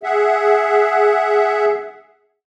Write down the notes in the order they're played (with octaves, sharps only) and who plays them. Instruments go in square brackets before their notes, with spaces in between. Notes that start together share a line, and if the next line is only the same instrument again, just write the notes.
[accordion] G#4 E5 F#5